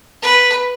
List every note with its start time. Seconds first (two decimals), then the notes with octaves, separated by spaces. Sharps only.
0.23 B4